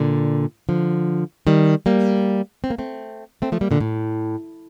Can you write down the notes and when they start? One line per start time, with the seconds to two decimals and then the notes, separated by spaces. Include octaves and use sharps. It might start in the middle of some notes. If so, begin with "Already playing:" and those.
Already playing: A#2 D3
0.69 D3 F3
1.47 D#3 G3
1.86 G3 A#3
2.64 C4
2.70 A#3
2.78 A3 C4
3.42 A3 C4
3.52 F3 A3
3.61 G3 A#3
3.71 A#2 D3
3.80 A2